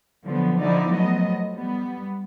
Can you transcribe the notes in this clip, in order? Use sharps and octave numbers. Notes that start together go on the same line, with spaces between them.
D3 F3 F#3 B3
D3 F3 D#4 E4 F#4 D5
F3 F#3 A3 B3 D#5
G3 B3